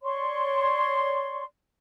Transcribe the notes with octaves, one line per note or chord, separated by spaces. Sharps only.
C#5 D5 C6 C#6